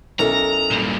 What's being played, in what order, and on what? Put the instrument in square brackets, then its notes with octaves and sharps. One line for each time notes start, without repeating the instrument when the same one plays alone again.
[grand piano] B1 A#4 [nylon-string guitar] C#4 E4 A4 [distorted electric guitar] A#5
[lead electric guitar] G2 A#2